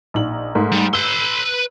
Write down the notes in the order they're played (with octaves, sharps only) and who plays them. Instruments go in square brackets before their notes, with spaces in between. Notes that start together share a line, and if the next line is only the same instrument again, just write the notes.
[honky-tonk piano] A#1 D#4 F#7
G#2 A3 A#4
[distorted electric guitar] G3
[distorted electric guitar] B4 C6 [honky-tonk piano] E6